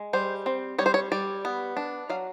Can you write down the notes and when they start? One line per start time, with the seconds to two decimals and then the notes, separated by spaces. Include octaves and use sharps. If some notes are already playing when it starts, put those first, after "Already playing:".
Already playing: G#3
0.13 G3 C5
0.46 C4
0.78 G3 C#5
0.86 C5
0.94 C#5
1.12 G3 D5
1.45 B3
1.77 D4
2.10 F#3 F5